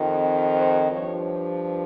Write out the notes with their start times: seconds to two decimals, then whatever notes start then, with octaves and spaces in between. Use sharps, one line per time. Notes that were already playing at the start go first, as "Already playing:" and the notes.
Already playing: F2 D#3
0.55 C5
0.92 G2 F3 C#5